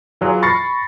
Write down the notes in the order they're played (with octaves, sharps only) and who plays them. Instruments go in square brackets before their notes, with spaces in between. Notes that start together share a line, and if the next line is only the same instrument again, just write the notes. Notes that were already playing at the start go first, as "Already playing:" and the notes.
[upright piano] E3 F#3 F4 G#4
B5 C#6 A6 A#6 C7 C#7